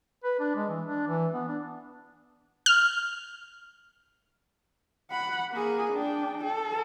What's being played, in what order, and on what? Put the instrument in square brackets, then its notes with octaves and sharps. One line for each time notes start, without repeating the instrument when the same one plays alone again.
[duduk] B4
D4
G#3
E3
D4
E3
B3
D4
[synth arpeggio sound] F6
[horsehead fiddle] F#5 B5
A#3 G#4
D4 G5
A4